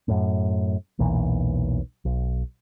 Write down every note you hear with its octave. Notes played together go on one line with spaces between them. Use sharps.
F#2 A2
E1 B1 A#2 E3
B1